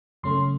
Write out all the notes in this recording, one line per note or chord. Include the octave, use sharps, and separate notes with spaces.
F#2 C#3 A3 C#4 C6